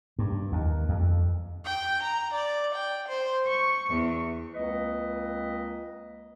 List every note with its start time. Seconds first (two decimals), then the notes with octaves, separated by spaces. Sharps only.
0.19 G2
0.52 D#2
0.89 F2
1.65 G5
2.02 A#5
2.34 D5
2.75 G5
3.08 C5
3.48 C#6
3.90 E2
4.54 C#2 A#3 C4 B4 D#5